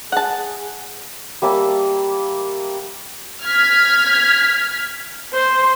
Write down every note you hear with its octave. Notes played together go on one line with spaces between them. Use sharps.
G#4 F#5 A5
G3 A#3 E5 A5
F6 G#6 B6
C5